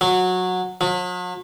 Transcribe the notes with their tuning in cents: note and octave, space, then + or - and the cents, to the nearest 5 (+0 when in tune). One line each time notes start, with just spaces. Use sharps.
F#3 -15
F#3 -45